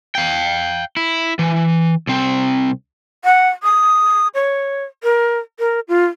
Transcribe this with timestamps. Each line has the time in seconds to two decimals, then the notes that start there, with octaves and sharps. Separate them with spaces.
0.15 F5 G5
0.96 E4
1.39 E3
2.07 C2 C4
3.24 F#5
3.63 D#6
4.35 C#5
5.03 A#4
5.59 A#4
5.88 F4